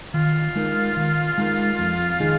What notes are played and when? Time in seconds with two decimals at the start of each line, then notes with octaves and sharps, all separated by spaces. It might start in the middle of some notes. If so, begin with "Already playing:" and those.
0.14 D#3 F4
0.56 G#3 D#4 A#4
0.97 D#3
1.38 G#3 D#4 A#4
1.79 F2
2.20 D#3 G#3 D#4 G#4